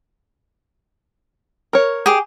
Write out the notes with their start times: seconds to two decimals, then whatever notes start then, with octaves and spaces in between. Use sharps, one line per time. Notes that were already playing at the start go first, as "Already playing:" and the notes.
1.73 A#4 C#5
2.06 G4 G#4